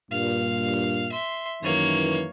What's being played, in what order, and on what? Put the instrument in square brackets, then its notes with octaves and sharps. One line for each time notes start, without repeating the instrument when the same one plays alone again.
[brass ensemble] G2 A#2 [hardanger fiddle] F5
[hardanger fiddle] E5 C6
[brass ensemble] F#2 D#3 E3 [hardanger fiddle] A#3 C#5